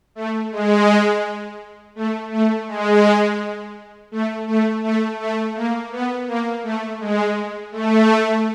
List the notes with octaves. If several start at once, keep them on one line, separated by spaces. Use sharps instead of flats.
A3
G#3
A3
A3
G#3
A3
A3
A3
A3
A#3
B3
A#3
A3
G#3
A3